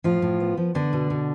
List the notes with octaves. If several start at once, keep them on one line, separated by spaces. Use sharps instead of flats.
A2 F3 F4
A2
B3
F3
D3 B3 D4
B2
B2